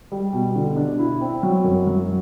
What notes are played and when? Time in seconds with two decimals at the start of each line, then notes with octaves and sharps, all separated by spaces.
0.12 G3
0.33 B2
0.55 D3
0.76 D4
0.99 E4
1.21 C4
1.43 F#3
1.64 F#2
1.87 F#3